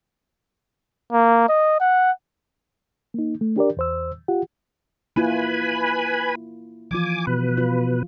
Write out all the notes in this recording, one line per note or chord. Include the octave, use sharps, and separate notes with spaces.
A#3
D#5
F#5
A#3 D#4
A3
D4 G4 A#4 D5
E2 C5 E6
F4 G4 F#5
A#3 E4 F4 B4 G#5 B5
E3 F3 F4 G#5 D6
B2 B4
F4